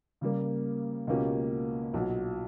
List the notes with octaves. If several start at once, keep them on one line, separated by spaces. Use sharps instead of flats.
C#3 G3 A#3
C#2 B2 A#3 C#4 G4
B1 A#2 F#3